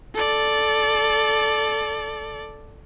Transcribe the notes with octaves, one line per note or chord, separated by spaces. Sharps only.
A4 D5